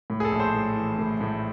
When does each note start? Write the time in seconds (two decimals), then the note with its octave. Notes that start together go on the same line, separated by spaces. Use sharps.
0.10 A2
0.20 G#4
0.25 A4
0.32 A#1
0.40 C5
0.54 A2
0.77 E3
0.99 A2
1.21 A2